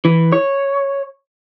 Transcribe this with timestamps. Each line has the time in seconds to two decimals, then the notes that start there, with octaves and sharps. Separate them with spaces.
0.05 E3
0.32 C#5